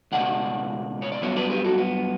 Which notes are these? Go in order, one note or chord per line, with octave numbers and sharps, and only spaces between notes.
C#2 B2 A3 D5 F#5
C#5
D5
G2 F#3 B3 C#5 E5
B4 D5
G4 B4
F#4 A4
B3